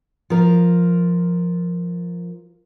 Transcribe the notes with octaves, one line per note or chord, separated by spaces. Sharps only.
F3 A#4